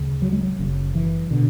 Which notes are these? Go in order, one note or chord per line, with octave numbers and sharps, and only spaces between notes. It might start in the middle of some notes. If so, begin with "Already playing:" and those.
Already playing: D2 C#3
F#3
G#3
F#3
F#1 F#2 C#3
E3
B2 D3